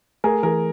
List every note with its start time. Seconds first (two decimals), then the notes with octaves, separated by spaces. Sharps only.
0.24 A3 G#4 A#4
0.43 E3 G#4 A#4